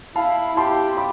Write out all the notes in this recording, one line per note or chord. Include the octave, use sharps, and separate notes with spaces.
E4 F5 A5
G4 A5 C6
B5 D6